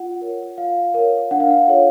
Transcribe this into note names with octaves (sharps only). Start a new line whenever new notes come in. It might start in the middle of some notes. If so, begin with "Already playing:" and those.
Already playing: F4 F#5
A#4 C#5
F4 F5
A#4 C#5
D4 F#5
F5
F#5
F4 A4 C#5